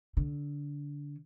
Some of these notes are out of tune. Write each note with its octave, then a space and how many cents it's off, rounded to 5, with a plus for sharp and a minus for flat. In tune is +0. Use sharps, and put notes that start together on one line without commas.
D3 -20